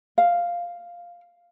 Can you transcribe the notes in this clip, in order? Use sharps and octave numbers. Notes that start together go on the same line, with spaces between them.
F5